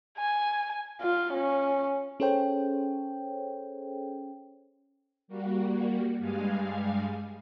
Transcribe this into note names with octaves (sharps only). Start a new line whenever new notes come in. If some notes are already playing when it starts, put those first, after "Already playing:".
G#5
F4
C#4
C#4 G#4 A4 C5 C#5 G5
G3 A#3 F#4
G2 G3 G#3 F5 G#5